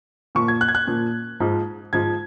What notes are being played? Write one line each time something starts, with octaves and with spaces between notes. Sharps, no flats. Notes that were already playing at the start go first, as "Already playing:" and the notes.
A#2 F3 C#6
G#6
F#6
G#6
F#6
A#2 F3
G#2 F3
G#2 F3 G#6